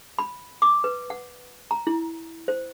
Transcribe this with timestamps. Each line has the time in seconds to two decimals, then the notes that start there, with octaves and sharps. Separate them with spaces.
0.19 B5
0.62 D6
0.84 B4
1.10 F#5
1.71 A#5
1.87 E4
2.48 C5